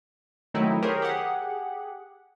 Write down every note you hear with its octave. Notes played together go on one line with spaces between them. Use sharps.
D#3 F#3 A3 C4 D#4 E4
G4 G#4 A#4 C5 C#5
G4 G#4 F#5